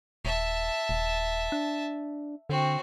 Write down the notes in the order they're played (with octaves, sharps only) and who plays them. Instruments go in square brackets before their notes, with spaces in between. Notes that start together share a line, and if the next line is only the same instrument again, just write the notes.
[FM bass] D#1 [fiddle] E5 A5
[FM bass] D#1
D4
[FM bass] D3 [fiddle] C4 F#4